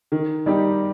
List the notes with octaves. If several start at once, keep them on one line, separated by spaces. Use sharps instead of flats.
D#3
G3 D#4 G4